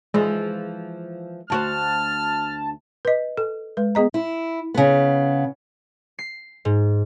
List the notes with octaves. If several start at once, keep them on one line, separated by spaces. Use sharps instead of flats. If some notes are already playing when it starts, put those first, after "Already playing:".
E3 F3 G#3
D2 F#4 C5 A5 F6
B4 D#5
A4
G#3 B4
B3 G#4 D#5 A#5
E4
C#3 B3
C7
G#2